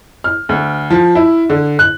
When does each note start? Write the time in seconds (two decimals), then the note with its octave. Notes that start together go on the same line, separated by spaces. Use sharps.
0.24 F6
0.49 D2
0.90 F3
1.15 E4
1.50 D3
1.79 F#6